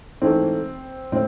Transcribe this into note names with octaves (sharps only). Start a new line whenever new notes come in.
G#2 E3 A3 C4
A2 C4